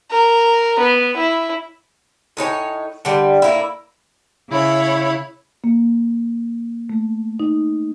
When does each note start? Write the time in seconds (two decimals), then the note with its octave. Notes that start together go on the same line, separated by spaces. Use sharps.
0.12 A#4
0.79 B3
1.17 E4
2.37 A2 D#4 C#5 G#5
3.05 D3 G3
3.42 A2 A#3 E4
4.49 C#3 E4 C#5 B5
5.64 A#3
6.90 A3
7.40 D#4